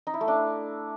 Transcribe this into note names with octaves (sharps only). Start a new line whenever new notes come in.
D#4
E4
A3
D4